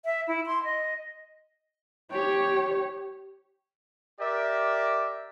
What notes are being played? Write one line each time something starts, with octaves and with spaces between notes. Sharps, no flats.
E5
E4
C6
D#5
G4 C#5
G4 A#4 D5 E5